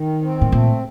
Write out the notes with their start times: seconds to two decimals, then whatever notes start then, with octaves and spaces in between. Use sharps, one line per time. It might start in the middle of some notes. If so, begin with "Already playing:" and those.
Already playing: D#3
0.22 C4
0.41 A2
0.52 A#2 A3